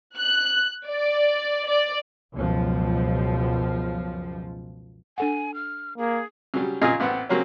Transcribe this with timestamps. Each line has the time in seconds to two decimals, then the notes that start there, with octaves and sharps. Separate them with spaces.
0.17 F#6
0.87 D5
1.67 D5
2.33 C#2 F#2 B2 F3
5.18 D4 A4 F#5 G#5
5.54 F6
5.98 A#3 G#4
6.54 C#3 F#3 G3
6.82 A#2 C#3 F4 G#4 D#5
7.00 A1 B3 C4 F#5
7.29 C#3 F#3 A#3 C4 C#4